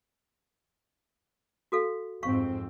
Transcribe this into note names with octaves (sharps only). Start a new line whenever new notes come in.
F#4 A4 F5
F2 G#2 C4 F5 C#6